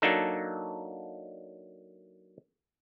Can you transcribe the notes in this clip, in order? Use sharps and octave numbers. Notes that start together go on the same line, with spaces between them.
F#3 A#3 D4 D#4 A4